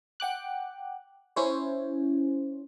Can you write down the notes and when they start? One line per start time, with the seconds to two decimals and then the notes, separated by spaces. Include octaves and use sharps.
0.20 F#5 G5 D6 F#6
1.36 C#4 E4 C5 C#5